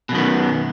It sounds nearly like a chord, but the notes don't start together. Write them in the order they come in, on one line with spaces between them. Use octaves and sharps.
B2 F#2 D#3 B3